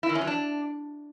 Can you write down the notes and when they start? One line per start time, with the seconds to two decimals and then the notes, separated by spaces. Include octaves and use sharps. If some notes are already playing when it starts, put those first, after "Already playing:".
0.03 E4
0.09 D#3
0.15 C#4
0.21 F#3
0.27 D4